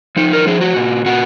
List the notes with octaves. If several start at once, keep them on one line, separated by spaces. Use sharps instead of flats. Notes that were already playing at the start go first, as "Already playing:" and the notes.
F3 D#4
A#4
F3 G#4
F#4
A#2
A#2 F#4